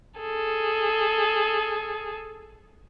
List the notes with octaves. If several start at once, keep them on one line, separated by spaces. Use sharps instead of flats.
G#4 A4